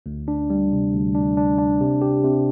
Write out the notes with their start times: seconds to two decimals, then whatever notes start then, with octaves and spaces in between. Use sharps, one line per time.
0.06 D2
0.28 D4
0.50 G3
0.72 C3
0.93 D2
1.15 D4
1.37 D4
1.58 D4
1.80 C3
2.02 G4
2.24 C3